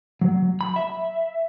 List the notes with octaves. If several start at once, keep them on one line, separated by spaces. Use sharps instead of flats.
F#3
B5
E5